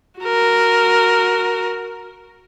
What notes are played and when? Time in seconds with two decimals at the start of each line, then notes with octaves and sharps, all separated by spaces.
0.20 F#4 A#4